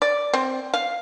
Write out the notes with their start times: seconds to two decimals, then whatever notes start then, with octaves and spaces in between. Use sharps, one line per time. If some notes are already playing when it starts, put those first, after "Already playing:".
0.02 D5
0.33 C4
0.74 F5